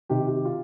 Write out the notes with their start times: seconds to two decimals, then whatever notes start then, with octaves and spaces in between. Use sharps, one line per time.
0.09 C3 D#3 G4
0.27 G4
0.45 F4